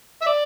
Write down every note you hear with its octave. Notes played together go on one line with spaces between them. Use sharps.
E5
D5